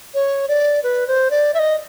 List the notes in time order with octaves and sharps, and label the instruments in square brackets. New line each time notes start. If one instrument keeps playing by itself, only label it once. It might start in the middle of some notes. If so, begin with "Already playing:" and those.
[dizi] C#5
D5
B4
C5
D5
E5
D#5